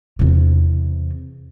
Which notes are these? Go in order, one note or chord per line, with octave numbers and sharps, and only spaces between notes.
E2 C3